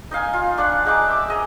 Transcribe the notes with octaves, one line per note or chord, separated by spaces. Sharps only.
D#4 D#5 F5 G#5
F4
D4 D5 F#5
G#3 D#4 F#5 D6
E5 D6
G#4 D#5 A#5